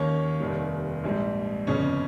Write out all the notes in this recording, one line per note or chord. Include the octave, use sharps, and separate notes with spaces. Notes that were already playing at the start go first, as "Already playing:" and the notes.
Already playing: D#2 D#3 A#3 C#4 C#5
F1 D#2 D#3 G3
A#1 G#2 G3
G1 F2 C#3 C#4 C#5